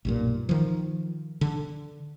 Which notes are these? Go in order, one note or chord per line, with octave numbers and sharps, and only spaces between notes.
B1 G2 A#2
D#3 F3
D3